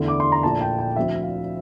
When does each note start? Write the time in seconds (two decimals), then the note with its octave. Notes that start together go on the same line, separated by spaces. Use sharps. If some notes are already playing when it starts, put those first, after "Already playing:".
Already playing: E2 D3 A3 E4 C6
0.08 D6
0.20 C6
0.32 A#5
0.43 A#1 A#2 A3 E4 A5
0.61 G5
0.79 G5
0.96 D2 D3 F3 C4 E4 E5
1.23 F5